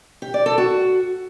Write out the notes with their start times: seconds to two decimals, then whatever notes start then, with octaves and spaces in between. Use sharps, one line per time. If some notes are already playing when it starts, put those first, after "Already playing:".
0.22 G4
0.34 D5
0.46 A4
0.58 F#4